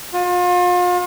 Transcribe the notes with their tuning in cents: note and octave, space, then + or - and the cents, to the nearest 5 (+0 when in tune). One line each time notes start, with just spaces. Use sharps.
F4 +35